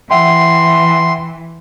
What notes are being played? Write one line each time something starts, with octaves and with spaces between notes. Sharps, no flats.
E3 E5 F#5 G5 C6